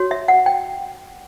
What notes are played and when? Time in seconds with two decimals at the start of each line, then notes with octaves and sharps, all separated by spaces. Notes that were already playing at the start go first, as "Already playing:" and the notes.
Already playing: F#4 C#5
0.11 E5
0.28 F#5
0.46 G5